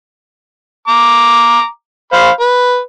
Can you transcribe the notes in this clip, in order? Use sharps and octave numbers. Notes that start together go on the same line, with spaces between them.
A#5 D6
C5 F5 B5
B4